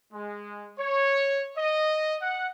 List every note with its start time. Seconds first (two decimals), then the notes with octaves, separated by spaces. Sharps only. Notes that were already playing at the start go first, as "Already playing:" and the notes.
0.13 G#3
0.78 C#5
1.57 D#5
2.21 F#5